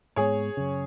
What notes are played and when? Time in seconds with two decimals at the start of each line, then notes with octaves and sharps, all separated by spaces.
0.16 G#2 G#3 B3 G#4 C#5
0.57 F#2 C#3